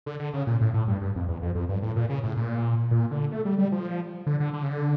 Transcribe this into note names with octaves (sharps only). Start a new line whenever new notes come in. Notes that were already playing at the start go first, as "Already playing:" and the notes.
D3
D3
C#3
A#2
A2
A2
G2
G2
F2
E2
F2
F2
G2
A2
A#2
C#3
A2
A#2
A#2
D3
A3
G3
G3
F3
D3
D3
D3
C#3
D3